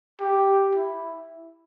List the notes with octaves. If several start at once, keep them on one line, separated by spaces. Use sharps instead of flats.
G4
E4